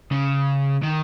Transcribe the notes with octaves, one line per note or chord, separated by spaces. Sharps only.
C#3
D#3